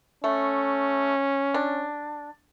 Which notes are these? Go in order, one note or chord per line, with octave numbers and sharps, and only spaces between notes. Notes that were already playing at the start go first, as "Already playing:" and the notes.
A3 C#4
D4